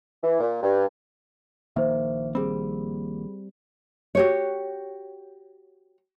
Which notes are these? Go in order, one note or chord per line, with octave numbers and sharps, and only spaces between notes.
E3
A#2
G2
A#1 D#3 A#3 C5 E5
G3 C4 G#4 B5
F#4 G4 C#5